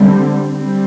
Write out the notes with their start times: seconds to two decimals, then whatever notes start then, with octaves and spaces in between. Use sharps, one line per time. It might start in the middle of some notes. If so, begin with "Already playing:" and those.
Already playing: D3 G3 C4
0.56 G3 C4